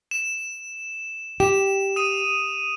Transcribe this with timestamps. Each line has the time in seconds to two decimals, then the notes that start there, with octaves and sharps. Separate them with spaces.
0.11 E7
1.40 G4 E7
1.96 D#6 D#7